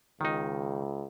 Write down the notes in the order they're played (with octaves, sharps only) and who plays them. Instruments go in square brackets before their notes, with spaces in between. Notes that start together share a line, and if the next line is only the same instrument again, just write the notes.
[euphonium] C#2 [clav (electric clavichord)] D#3 D#4